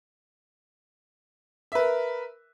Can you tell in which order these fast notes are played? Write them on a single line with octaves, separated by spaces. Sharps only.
E5 B4 A#4